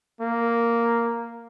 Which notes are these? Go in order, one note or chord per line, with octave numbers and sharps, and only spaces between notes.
A#3